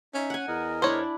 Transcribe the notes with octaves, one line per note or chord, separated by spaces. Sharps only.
C#4 D#4 E5
F#5 G#5
E2 A#4 D#5
D4 E4 C5 C#5